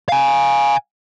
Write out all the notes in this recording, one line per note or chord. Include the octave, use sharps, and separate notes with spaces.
F5 G#5